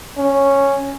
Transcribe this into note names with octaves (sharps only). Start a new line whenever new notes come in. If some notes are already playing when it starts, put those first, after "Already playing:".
C#4